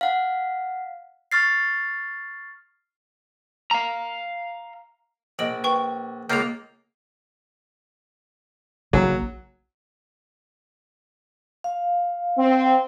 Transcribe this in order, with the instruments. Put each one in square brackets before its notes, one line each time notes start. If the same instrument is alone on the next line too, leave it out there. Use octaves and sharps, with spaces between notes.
[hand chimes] F5 F#5
C#6 F6 A6 C7
[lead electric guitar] F5 A#5
[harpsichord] A#1 [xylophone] D#5 D7 F#7
[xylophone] B4 G5 C#6
[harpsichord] C#2 A#3 F4 [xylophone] G6 F7
[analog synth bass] A#1 [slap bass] C#3 A#3 [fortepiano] F#3
[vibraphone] F5
[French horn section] C4